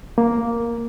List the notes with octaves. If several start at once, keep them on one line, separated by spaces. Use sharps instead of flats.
A#3